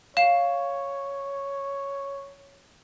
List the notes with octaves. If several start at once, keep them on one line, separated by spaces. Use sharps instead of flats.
C#5 F5 C7 E7